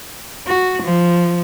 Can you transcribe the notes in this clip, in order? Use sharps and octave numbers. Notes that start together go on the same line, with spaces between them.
F#4
F3